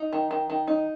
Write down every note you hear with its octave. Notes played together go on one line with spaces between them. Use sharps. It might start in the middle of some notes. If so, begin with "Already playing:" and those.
Already playing: D#4
D#3
D#3
D#3
D#4